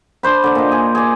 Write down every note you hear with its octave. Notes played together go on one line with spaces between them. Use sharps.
D4 C5 B5
D3 D5
A#2 D#5
G#4
G#4 D5